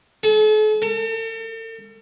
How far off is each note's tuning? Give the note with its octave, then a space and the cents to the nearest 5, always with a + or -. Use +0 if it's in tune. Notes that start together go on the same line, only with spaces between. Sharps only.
A4 -45
A4 +45